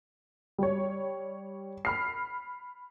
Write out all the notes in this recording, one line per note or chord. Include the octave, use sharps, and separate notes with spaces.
G3 C#5
B5 F6 C7